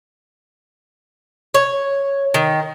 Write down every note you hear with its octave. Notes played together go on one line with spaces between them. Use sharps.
C#5
D#3